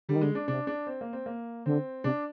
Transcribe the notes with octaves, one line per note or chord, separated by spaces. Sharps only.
D3 G3
D#3
D3 G#3
D4
C3 D4
D4
C4
A#3
C4
A#3
D3 C4
C3 D4